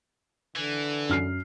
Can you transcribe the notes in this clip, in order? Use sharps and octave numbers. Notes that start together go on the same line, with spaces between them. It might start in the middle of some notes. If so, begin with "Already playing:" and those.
D3 E3
F#2 F6 C7